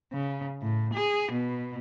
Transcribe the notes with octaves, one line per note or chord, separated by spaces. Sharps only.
C#3
A2
G#4
B2